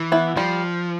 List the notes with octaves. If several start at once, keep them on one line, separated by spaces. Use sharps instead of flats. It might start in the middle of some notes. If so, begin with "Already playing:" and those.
Already playing: E3
B3 E4
F3 G3